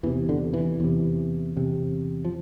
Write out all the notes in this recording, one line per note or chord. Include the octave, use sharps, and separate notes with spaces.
E2 C3 E3
D3
E3
E2 C3
E2 C3
F3